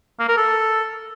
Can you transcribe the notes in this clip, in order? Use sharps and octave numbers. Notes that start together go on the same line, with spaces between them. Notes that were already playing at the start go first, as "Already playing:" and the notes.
A#3
A#4
A4